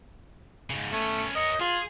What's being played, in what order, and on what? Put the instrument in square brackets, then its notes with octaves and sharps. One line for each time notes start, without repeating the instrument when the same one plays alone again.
[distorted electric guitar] G#2 C#3
[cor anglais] A3 [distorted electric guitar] B3 C#4
[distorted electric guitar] A#4 C#5 [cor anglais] D#5
[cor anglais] F4 [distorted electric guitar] G#4